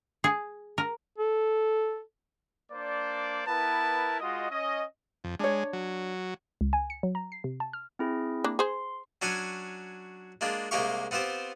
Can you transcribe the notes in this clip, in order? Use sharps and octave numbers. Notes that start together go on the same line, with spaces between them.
G#4
A#4
A4
A#3 D4 C5 D5
B3 E4 A#4 B4 A5
G#3 F4 F#4 D#5
C#4 D#5
F2
G#3 D4 C#5
F#3
C#2
G#5
C#7
F#3
A#5
C7
C3
A5
F6
C4 E4 G#4
A#3 D4
G#4 C5 C6
F#3 C#4 D4 C#5 G#5
G#3 A#3 D4 F4
C2 G#3 A#3 G4 F5 C#6
B3 C4 F4 G4 C5